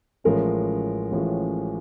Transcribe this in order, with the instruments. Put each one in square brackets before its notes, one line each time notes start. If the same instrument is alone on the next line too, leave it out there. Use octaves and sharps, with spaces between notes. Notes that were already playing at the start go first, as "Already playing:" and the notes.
[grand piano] A1 A2 F3 G#3 C#4 A#4
A1 A2 F3 G#3 C#4